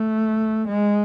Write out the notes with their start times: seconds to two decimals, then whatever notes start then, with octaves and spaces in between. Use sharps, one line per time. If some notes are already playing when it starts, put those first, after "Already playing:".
Already playing: A3
0.67 G#3